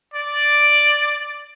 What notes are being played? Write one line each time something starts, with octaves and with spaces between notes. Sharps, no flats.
D5